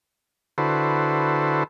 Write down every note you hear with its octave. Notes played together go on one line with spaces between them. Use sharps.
D3 E4 F#4 A4 B4 C5